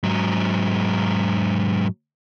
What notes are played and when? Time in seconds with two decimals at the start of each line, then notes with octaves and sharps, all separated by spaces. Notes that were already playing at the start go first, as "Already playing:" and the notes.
0.03 G#2 F#3